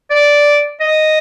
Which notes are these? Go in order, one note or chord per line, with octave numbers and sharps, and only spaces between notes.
D5
D#5